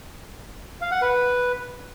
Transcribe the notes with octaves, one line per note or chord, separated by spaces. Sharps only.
F5
F#5
B4